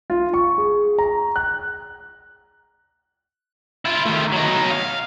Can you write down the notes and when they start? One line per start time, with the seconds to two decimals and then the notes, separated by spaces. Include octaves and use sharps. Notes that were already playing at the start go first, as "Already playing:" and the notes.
0.10 F4
0.34 C#6
0.58 G#4
0.98 A#5
1.36 F#6
3.85 E4 F4
4.06 D#3 A3
4.32 F#3 D#4
4.71 F5